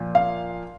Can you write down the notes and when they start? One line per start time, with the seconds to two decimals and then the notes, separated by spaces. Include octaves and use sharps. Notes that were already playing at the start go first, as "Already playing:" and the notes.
Already playing: A#2 F3
0.15 F5